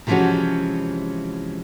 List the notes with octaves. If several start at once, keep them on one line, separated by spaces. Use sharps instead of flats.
C3 E3 F3 G#3 C#4 F#4